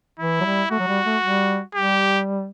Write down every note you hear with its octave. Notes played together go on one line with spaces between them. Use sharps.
E3 E4
F#3
G3
A3 F#4
F#3
G3
A3
G3
G3 G4